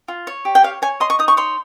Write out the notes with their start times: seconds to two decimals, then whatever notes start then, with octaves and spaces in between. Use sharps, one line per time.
0.08 F4
0.27 C#5
0.45 G4
0.55 G5
0.63 C#5 F5
0.82 C#5 G#5
1.00 D#5 C6
1.10 C#6
1.19 D#4 D#6
1.28 C#6
1.37 C#5 C6